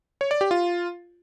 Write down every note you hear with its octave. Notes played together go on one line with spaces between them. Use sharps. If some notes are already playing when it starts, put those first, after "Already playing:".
C#5
D5
G4
F4